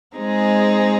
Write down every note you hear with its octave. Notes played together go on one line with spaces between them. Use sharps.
G#3 C4 D#4 G#4